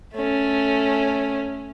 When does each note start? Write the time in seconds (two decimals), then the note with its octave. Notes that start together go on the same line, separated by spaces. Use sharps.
0.13 A3 C#4